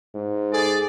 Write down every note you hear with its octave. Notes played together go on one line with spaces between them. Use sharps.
G#2
G#4 A4 D5